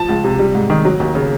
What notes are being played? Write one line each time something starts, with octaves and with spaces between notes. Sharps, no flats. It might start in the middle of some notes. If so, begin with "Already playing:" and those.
Already playing: F3 A5
C#2
C3
G3
G#2
D#3
F#3
D#2
C#3